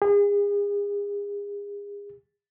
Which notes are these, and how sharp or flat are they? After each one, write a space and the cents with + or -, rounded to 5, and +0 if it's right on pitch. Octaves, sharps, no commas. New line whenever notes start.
G#4 -35